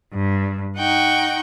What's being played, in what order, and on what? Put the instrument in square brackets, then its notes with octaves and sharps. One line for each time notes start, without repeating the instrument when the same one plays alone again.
[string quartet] G2
D#4 F#5 G5 C#6